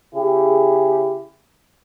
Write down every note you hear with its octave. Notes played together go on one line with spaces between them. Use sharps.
C#3 E4 G4 G#4